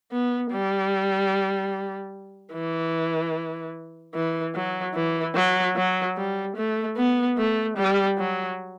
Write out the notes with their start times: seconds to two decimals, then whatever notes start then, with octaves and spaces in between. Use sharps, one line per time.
0.12 B3
0.52 G3
2.53 E3
4.15 E3
4.55 F#3
4.95 E3
5.35 F#3
5.76 F#3
6.17 G3
6.57 A3
6.97 B3
7.38 A3
7.77 G3
8.18 F#3